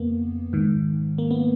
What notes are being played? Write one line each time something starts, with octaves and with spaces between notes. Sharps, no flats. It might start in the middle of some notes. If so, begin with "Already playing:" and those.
Already playing: F2 C#3 A#3 B3
G#2 D#3
A#3
B3